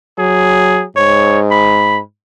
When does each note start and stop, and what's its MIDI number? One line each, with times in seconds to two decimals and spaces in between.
0.18 0.84 54
0.18 0.85 68
0.97 2.00 44
0.97 1.39 73
1.51 2.00 83